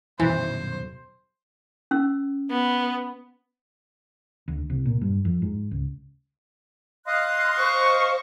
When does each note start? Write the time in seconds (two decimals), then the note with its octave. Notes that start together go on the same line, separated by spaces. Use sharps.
0.20 D#1 B1 F#2 E3 C5
1.91 C#4 E6
2.50 B3
4.48 D2
4.70 C2
4.86 A#2
5.01 G2
5.25 F2
5.42 G#2
5.71 C#2
7.07 D#5 F5 C6 F#6
7.58 C5 C#6